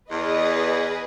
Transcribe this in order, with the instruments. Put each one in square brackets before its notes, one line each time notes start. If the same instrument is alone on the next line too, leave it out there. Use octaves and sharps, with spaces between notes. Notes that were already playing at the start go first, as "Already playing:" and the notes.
[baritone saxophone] E2 [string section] G#4 B4 D#5